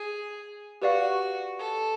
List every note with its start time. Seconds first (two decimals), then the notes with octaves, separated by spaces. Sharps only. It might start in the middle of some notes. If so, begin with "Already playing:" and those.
Already playing: G#4
0.82 F#4 G4 B4 D5 F5
1.59 A4